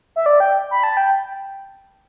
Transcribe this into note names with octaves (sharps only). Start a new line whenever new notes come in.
E5
D5
G5
B5
A5
G5